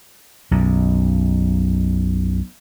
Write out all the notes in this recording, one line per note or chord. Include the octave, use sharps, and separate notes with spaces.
B1 F#2